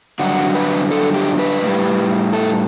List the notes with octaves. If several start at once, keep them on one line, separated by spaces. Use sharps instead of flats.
G2 D3 F#3 F#4
B4
A4
G4
B4
A2 G3
A4